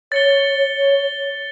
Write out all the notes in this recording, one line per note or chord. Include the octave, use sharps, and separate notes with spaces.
C#5 A6 C#7 G7
C#5